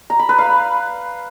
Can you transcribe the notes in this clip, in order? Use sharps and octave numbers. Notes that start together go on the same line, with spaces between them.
A#5
B5
B4
F5